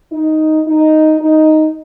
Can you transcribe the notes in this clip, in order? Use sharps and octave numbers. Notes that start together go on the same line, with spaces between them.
D#4
D#4
D#4